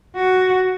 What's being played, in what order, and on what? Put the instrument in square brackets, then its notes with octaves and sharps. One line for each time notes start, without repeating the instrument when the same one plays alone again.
[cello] F#4